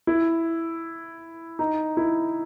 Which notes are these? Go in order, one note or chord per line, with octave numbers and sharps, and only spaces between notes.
E4
D#4
E4